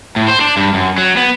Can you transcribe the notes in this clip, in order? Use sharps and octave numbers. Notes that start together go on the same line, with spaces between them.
A2
C5
D4
G2
F#2
F#3
B3